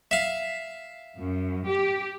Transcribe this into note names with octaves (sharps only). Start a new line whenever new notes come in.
E5 F5
F#2
G4